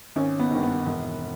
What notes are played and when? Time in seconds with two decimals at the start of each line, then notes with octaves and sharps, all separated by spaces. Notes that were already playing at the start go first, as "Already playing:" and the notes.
0.16 G#1 C#4
0.39 B3
0.51 G2 D#3
0.63 B3
0.86 E1